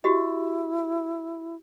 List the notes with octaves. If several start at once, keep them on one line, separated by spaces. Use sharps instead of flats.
E4 F#4 G4 D#5